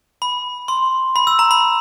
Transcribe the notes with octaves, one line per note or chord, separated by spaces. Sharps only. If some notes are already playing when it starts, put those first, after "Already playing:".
B5
C6
B5
E6
A#5
B5